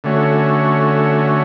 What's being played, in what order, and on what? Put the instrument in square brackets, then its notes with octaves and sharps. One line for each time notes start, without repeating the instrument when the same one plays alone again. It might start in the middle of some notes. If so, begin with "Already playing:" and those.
[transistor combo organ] D3 A3 C#4 F#4